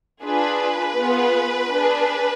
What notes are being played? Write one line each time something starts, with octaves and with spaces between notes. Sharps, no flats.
D4 F4 G#4 B4
B3 F4 G#4
D4 G#4